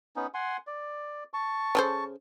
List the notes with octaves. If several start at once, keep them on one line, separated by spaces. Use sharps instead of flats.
B3 C#4 D#4
F#5 G#5 C6
D5
A5 C#6
C#3 A4 C5